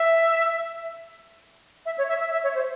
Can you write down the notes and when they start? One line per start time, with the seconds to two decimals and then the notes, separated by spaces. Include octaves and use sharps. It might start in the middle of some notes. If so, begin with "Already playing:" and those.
Already playing: E5
1.86 E5
1.98 C#5
2.09 E5
2.20 E5
2.32 E5
2.44 C#5
2.55 C5